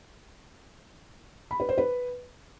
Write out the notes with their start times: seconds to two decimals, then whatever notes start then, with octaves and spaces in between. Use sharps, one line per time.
1.51 B5
1.60 B4
1.69 C5
1.78 B4